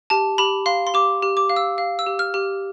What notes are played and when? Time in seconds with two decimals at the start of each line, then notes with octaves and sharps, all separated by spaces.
0.10 G4 A5
0.38 G4 B5
0.66 F5 C6
0.87 C6
0.94 G4 D6
1.22 G4
1.37 D6
1.50 F5
1.56 E6
1.78 F5
1.99 E6
2.06 G4
2.19 F6
2.34 G4